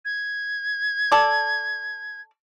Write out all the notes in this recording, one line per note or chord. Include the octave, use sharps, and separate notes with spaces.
G#6
A4 D5